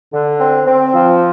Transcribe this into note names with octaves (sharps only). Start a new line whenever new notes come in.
D3
C4
C4
F3